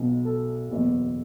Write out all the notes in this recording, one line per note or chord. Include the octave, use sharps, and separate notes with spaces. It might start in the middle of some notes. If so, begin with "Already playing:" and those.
Already playing: B1 B2
A4
F#1 E2 B2